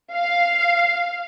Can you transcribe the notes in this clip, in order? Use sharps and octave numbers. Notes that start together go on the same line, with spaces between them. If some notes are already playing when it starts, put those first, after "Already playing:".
F5